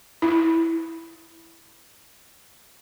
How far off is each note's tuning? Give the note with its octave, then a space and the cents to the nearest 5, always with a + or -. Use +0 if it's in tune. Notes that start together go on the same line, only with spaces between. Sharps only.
E4 +0